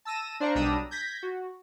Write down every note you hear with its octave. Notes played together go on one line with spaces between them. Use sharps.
A5 E6 A#6 D#7 E7
D4 C5 D5 F5 A#5 C#6
B1 G3 D4 A#5 D#6 E6
G6 G#6 A#6 B6
F#4